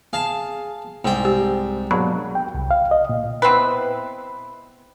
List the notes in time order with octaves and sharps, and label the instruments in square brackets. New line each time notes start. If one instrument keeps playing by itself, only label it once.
[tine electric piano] G#4 [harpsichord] F5 A5
[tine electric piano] C2 C4 D5 [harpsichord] G#2 G5
[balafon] G4
[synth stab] G#2 F#3 [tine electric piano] B2 A#3 D4 [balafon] B5
[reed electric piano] G5
C2
F5
D#5
A#2
[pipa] B3 C4 E4 B4